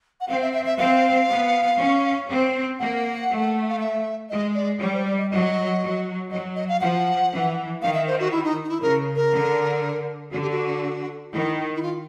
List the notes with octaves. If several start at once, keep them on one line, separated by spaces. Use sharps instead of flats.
F#5
C4 F5
E5
E5
E5
C4 F5
B3
C#4
C4
A#3 F#5
A3
F5
E5
G#3 D#5
D5
G3 C#5
C5
D5
D#5
F#3 D#5
F#3
F#3 D#5
D#5
F5
F3 F#5
E3
D#3 F5
E5
C5
F#4
E4
D#4
D#4
E4
C#3 A#4
A#4
D3
D3 F#4
G4
F#4
D#3 E4
E4
F4